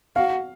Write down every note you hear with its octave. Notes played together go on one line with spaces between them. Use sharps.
F#4 F5